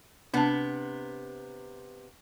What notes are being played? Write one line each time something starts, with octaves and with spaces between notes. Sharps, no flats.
C3 B3 D4 A5